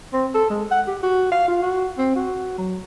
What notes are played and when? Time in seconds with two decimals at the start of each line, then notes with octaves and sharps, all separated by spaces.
0.13 C4
0.35 A4
0.50 G#3
0.71 F#5
0.87 G4
1.03 F#4
1.32 F5
1.48 F4
1.62 F#4
1.98 C4
2.16 F#4
2.58 F#3